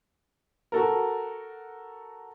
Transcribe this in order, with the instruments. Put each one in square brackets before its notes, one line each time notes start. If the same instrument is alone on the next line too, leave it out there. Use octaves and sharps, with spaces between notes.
[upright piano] F#4 A4 A#4